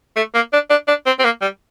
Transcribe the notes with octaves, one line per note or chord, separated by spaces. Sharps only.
A3
A#3
D4
D4
D4
C4
C4
A#3
G3